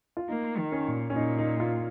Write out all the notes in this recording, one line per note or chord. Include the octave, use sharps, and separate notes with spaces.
F4
A#3 D#4
D#3
C#4
A#2
C#4
A#2 D#4
D#4
F4